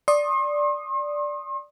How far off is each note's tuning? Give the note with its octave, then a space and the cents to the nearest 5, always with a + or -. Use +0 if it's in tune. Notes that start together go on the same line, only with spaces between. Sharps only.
D5 +0 C6 +40 D#6 -5